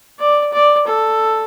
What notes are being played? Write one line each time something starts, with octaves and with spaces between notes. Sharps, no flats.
D5
D5
A4